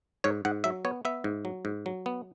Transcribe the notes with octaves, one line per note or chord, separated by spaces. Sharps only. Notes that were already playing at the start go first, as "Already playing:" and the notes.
G#2 C#5
G#2 F#5
F#3 E5
B3 C#5
B3 E5
G#2
F#3
G#2
F#3
B3